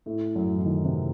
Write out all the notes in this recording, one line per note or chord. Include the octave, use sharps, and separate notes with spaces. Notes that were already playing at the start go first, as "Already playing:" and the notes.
A2 A3
F#2 F#3
E3
D#3
C3